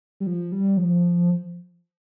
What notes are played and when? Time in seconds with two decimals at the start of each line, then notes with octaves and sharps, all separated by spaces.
0.20 G3
0.27 F3
0.52 G3
0.77 F3